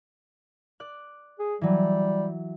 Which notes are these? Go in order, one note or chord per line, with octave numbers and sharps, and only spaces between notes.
D5 F#6
G#4
E3 F#3 G3